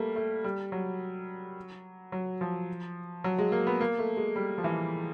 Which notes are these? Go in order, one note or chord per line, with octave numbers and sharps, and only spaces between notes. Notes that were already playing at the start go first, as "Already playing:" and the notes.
Already playing: G3 A3 A#3
A3
G3
F#3
F#3
F3
F#3
G#3
A#3
B3
A#3
A3
G#3
G3
F3
E3